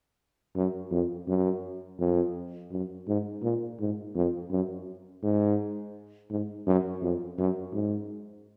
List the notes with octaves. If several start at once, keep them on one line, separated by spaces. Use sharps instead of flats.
F#2
F2
F#2
F2
F#2
G#2
A#2
G#2
F2
F#2
G#2
G#2
F#2
F2
F#2
G#2